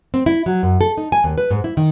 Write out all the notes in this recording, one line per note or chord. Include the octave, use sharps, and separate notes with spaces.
C4
E4
F#3
F#2
A4
D#4
G#5
D#2
B4
G#2
E4
D#3